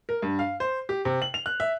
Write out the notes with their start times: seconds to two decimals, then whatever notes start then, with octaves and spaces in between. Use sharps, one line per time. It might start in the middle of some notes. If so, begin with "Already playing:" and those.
0.09 A#4
0.22 G2
0.39 F5
0.60 C5
0.89 G4
1.05 C3
1.22 F#7
1.34 F7
1.46 F#6
1.60 E5